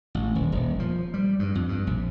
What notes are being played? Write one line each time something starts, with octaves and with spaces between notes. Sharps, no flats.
A1
D#1
D#1
F3
G3
G2
F2
G2
A#1